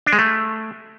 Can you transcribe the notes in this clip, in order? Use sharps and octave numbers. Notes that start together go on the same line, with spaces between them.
D4
G#3
A3